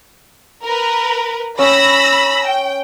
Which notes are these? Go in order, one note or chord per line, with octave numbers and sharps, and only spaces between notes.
A#4 B4
C#4 G5 B5 E6 A#6
G5